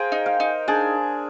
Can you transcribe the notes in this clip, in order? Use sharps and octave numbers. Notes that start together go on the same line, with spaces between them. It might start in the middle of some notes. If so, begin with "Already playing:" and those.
Already playing: G#4 A#4 C5 F5 G5
D#4
F5
D#4
D4 G#4